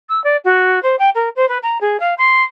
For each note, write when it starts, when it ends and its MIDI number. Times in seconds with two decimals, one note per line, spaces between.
0.09 0.22 88
0.24 0.37 74
0.44 0.82 66
0.83 0.96 72
0.99 1.10 79
1.15 1.29 70
1.36 1.48 72
1.48 1.58 71
1.63 1.78 82
1.81 2.00 68
2.00 2.14 77
2.18 2.43 84